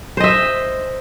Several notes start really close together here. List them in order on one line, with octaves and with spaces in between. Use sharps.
C5 D#5 E5